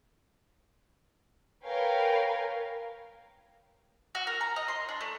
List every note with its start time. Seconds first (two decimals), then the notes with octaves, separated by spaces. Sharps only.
1.63 A#4 B4 C#5 F5 G5 G#5
4.15 F#4
4.27 A#4
4.41 A#5
4.56 D#5
4.68 C6
4.89 D4
5.01 A3